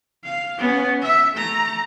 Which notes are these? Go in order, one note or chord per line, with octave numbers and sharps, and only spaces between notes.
F5
B3 C#4
E5
A3 A#5